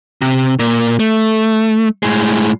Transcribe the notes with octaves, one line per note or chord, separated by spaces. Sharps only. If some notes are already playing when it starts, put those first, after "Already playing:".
C3
A#2
A3
A2 G#3